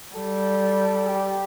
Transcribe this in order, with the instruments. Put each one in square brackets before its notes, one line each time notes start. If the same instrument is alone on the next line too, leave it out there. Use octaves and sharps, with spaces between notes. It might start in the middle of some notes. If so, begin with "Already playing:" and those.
[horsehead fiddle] G3 [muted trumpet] A4
[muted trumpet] G4